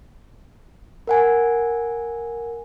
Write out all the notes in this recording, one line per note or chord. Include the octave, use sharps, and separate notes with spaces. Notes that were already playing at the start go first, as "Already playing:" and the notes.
A#4 F#5 G#5